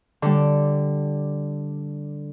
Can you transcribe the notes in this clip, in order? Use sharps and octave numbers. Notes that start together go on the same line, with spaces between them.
D3 G3